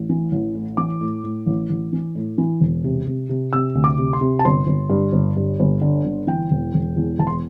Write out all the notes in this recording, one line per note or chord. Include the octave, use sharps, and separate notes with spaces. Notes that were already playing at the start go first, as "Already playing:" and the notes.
Already playing: A1
E3
A1
A2
E3 D6
A2
A2
A1
A1
E3
A2
E3
E1
C3
C3
C3
C3 E6
D2
D6
C3
C6
C3
A5
G1 C6
G1
G2
G1
G2
G1
D3
G1
E3 G5
E1
E1
E2
E1 A5
C6